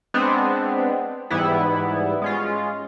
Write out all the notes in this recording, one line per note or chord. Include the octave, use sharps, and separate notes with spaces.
G#3 B3 C4 D4
G#2 E3 G3 B3 E4
G#3 C#4 F4